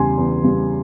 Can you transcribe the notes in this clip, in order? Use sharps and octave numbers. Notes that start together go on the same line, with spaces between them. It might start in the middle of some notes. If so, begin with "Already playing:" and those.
Already playing: E2 C#3 G3 G#5 C6
E2
C#3 G3